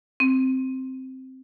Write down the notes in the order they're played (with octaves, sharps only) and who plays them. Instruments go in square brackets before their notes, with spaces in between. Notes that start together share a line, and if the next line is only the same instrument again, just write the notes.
[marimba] C4